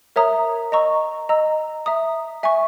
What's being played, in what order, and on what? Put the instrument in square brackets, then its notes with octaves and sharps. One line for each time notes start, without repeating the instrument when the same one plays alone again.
[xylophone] A#4 C#5 E5 A#5 D#6
D#5 A#5 C#6 E6
D#5 A#5 E6
E5 A#5 D#6
E5 G#5 C#6